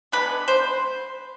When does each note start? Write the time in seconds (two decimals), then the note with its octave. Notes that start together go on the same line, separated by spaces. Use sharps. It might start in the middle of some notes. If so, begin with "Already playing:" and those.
0.12 D3 G#3 B3 B4
0.48 C5